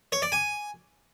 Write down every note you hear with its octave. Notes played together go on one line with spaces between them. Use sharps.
C#5
D5
G#5